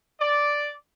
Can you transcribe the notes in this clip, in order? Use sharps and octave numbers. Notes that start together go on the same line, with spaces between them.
D5